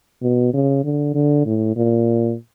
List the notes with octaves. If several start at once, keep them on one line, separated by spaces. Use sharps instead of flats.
B2
C#3
D3
D3
A2
A#2